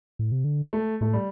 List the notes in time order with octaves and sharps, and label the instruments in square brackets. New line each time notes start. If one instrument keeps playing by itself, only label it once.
[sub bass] A2
C3
D3
[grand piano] A3
[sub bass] A2 [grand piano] A3
[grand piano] G3